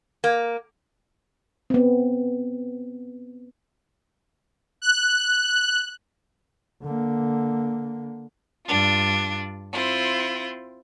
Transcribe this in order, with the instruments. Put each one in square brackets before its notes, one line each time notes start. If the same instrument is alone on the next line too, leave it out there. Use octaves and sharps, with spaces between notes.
[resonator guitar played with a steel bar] A#3
[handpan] B3 C4
[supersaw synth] F#6
[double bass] D3 A#3
[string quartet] G2 D4 F4
C4 E4 F4